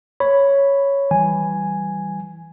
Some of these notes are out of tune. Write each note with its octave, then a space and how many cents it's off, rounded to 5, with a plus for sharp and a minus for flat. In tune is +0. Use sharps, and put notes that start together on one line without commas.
C#5 +0 B5 +0
E3 +0 G3 -15 G#5 +0